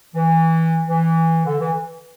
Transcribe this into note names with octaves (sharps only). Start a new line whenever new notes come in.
E3
E3
D3
E3